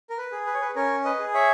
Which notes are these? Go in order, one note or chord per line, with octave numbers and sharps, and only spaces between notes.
A#4
B4
G#4
B4
C#5
B4
C#4 A#4 C#5
B4 D#5
G#4
C#5 E5